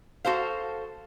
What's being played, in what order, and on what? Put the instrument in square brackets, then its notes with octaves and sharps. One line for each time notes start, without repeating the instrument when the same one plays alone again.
[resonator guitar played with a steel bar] F#4 A4 C5 F5